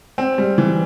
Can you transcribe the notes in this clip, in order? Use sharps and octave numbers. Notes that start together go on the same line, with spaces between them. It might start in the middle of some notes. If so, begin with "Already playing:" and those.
C4
G3
E3